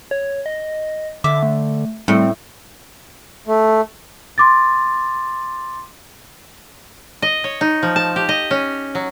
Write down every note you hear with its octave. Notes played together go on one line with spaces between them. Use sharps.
C#5
D#5
D3 E5 D6
A3
A2 G3 C4
A3
C6 D6 A6
D#5
C#5
D#4
F3
A5
G4
D#5
C#4
F#3